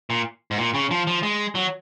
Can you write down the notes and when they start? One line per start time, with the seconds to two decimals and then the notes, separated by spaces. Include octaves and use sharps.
0.10 A#2
0.51 G#2
0.58 A#2
0.74 C#3
0.91 F3
1.07 F3
1.23 G#3
1.55 F#3